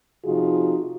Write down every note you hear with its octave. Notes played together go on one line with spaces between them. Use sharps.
C3 F3 D#4 F4 F#4 G#4